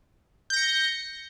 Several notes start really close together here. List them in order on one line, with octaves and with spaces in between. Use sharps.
G6 A#6 C#7